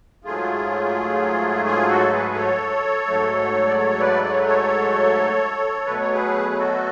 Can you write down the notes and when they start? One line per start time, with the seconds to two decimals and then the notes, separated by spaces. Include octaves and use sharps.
0.24 G#2 F#3 A3 F4 G#4
1.65 F4 G#4
1.89 F#4 A4
2.12 G#4 B4
2.35 A4 C#5
3.07 G#2 F#3 A3
3.67 D5
3.77 A4 C#5
3.99 B4 D5
4.24 D5
4.31 C#5
4.38 B4
4.46 A4 C#5
5.86 B2 F#3 A3 B4
6.00 C#5
6.13 G#4 B4
6.51 G#4
6.57 F#4 A4